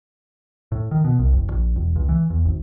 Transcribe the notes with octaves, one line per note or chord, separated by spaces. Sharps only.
A2
D#3
B2
C2
F#1
A#1
E1
C#2
E3
E2
G#1